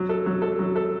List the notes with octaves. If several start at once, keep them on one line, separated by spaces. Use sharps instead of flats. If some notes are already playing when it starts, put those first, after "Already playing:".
Already playing: F#3
A4
F#3
A4
F#3
A4